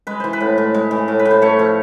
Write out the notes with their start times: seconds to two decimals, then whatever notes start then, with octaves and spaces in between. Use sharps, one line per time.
0.07 G#3 B4
0.20 E3 C5
0.33 B4
0.40 A2
0.58 A2
0.74 G#3
0.91 E3
1.08 A2
1.19 B4
1.25 A2
1.31 C5
1.42 A3 C#5
1.59 F3